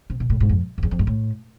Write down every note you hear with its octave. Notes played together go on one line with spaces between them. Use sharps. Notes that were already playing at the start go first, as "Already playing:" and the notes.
C3
B2
A2
G#2
F2
F2
E2
F2
G#2
A2